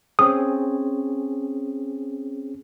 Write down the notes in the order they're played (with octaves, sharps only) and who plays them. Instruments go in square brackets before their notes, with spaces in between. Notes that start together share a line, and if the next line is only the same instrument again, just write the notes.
[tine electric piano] C4 C#4 G#4 [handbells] D#6